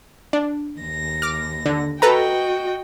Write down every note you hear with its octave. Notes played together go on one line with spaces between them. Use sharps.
D4
D#2 A#6
D6 F6
D3
F#4 A4 B4 D#5 G5 A#5